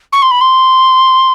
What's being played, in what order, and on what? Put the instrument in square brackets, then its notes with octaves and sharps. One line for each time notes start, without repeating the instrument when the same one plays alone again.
[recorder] C#6
C6
B5
C6